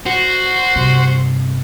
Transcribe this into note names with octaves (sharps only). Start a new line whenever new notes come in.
F#4 C5
G2 C3